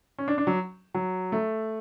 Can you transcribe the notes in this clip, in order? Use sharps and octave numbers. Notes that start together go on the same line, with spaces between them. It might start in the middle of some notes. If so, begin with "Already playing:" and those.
C#4
D4
D4
F#3
F#3
A3